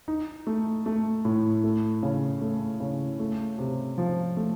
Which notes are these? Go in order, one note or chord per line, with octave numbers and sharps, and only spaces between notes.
D#4
A3
A3
A2
A3
C#3
A3
C#3
A3
C3
F3
A3